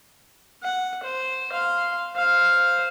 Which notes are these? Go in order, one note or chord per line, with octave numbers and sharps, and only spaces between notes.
F#5
C5
F5 C6
C5 F5